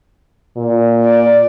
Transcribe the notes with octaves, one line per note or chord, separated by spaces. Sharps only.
A#2
D5